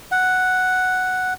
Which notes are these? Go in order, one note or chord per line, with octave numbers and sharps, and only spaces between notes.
F#5